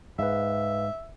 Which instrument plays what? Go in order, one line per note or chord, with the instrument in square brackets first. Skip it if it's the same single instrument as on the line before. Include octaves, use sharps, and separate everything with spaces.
[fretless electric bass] G#2 [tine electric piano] B4 F5 [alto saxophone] E5